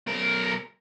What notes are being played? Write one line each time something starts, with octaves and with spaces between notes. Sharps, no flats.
B1 A#4